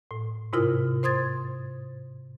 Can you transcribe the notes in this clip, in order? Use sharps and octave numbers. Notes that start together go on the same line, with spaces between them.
A2
G#2 C3 E4 F4 A#4 D#6
C5 C6 D#6 G#6 A6